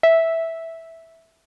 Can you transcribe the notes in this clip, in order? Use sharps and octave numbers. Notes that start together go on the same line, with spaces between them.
E5